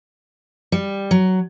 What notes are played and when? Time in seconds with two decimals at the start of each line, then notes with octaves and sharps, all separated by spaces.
0.72 G3
1.11 F#3